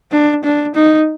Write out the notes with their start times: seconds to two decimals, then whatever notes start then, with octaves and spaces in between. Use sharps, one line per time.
0.12 D4
0.44 D4
0.75 D#4